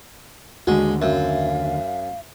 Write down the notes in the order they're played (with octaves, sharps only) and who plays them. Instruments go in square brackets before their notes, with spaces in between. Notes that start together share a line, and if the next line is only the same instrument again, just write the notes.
[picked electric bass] D#2 D3 [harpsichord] G#3 [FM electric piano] F#4
[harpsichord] F#2 [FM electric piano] E5 [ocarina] F5